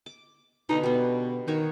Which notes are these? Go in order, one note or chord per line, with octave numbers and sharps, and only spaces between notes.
D6
B2 D3 D#4
B2 G3 B3
D#3 D#4 F#4 C#5